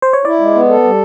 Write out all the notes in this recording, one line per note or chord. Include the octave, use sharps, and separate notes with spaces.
C5
C#5
E4 D5
G#3
B3
A4
G3